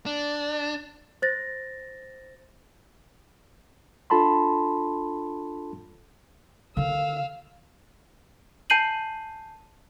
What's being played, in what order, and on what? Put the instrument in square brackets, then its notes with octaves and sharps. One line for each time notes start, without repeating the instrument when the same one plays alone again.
[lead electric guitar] D4
[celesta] C5 A6 A#6
[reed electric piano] D4 F4 A4 A5 B5 C6
[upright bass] D3 D#3 [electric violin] F5 E6
[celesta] G#5 A5 G6 C7 D#7 F#7